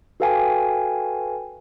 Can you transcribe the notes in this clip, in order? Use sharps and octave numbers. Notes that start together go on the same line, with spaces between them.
F#4 A4 B4 F5 G5 G#5